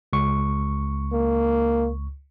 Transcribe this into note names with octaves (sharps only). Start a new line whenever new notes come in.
C#2 C#6
A#3